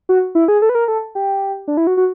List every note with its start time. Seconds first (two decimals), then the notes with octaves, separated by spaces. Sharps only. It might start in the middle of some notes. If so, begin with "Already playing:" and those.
0.09 F#4
0.35 E4
0.48 G#4
0.62 A4
0.69 B4
0.75 A#4
0.88 A4
1.15 G4
1.68 D4
1.77 E4
1.87 F#4
1.97 F#4